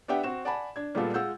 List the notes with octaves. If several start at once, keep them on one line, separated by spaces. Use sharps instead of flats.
B3 D4 G4 E5 F#5 G5
C4 F#4 E7
D5 F#5 G#5 A5 B5
D4 G#6
A#2 G3 G#3 B3 F4 A4
G#3 F4 F#5 E6 G6